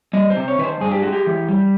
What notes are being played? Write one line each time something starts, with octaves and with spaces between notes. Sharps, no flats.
G3 D#5
C5
C3
C#5
D#3 B4
C5
G2 G#4
G4
G#3 F#4
G4
E3
G3